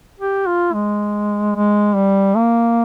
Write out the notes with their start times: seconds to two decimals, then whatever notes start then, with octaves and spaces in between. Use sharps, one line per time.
0.20 G4
0.47 F4
0.73 G#3
1.56 G#3
1.95 G3
2.36 A#3